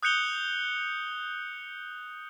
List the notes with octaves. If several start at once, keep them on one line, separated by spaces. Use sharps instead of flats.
D#6 F#6 G6 C#7 F7 G7